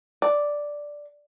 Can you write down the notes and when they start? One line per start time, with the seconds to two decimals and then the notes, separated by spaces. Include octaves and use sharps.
0.22 D5